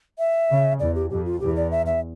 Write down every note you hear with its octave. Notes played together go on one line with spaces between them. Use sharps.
E5
C#3
E2 D5
G4
F2 G4
F4
E2 G4
D5
E5
E5